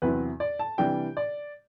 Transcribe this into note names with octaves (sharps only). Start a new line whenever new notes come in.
E2 C3 F#3 C4 E4 B4
D5
A5
C3 E3 G3 D4 G5
D5